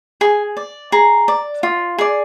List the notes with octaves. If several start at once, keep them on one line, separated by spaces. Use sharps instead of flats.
G#4 G#5
D5
G#4 A#5
D5
F4
G#4 D5